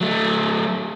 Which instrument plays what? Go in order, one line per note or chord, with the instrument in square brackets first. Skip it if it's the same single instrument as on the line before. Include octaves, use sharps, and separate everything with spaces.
[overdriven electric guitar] F#3 A3